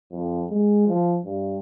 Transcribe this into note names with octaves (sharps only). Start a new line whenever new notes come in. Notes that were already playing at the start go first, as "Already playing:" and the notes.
F2
G#3
F3
G2